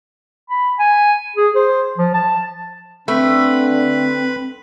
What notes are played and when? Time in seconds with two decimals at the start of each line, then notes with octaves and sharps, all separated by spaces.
0.50 B5
0.79 G#5
1.36 G#4
1.56 C5
1.98 F3
2.14 A5
3.08 D3 A3 C4 B4 B5